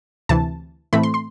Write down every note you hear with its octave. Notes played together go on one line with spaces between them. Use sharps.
D2 C3 E3 A5
A2 E3 A3 C4 B5
C6
C6